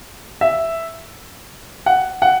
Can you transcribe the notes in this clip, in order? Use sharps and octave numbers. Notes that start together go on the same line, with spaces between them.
E5
F#5
F#5